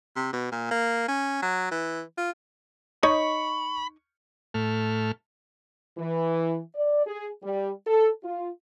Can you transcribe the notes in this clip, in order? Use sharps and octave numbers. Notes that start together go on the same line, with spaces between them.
C3
B2
A#2
A#3
C#4
F#3
E3
F4
D#4 C#5 D#5 B5 C#6
A2 A3 F6
E3
D5
G#4
G3
A4
F4